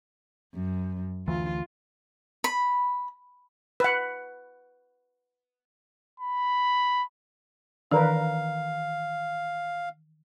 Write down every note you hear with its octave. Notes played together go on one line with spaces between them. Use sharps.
F#2
D2 E3 F4
B5
B4 F#5
B5
D#3 E3 D4 A#4 B4 F5